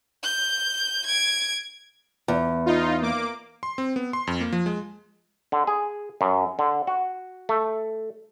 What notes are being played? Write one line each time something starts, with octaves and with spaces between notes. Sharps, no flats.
G6
G#6 D7
E2
D#4 F4
A#3 D6
C6
C4
B3
C6
F2
A#3
F3
G#3
D3
G#4
F#2
D3
F#4
A3